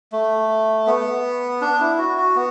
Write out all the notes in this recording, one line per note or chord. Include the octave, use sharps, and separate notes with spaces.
A3
B3
D4
E4
F#4
F#4
B3